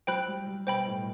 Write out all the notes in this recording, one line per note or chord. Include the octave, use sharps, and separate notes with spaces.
F#3 C5 G5 B5 F#6
G3
G3
B2 C5 G5 B5
A2